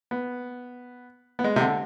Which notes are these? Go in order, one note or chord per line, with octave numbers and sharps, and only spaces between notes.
B3
B3
G#3
C3
D3